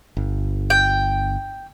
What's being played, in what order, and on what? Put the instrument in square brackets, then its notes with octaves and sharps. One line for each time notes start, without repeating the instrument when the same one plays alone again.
[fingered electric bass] G1
[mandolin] G5